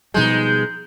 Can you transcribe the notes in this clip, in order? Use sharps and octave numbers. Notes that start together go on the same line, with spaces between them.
B2 F3 G3 G#3 D#4 G6